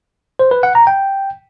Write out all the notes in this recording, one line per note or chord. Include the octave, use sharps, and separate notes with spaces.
C5
B4
F#5
A#5
G5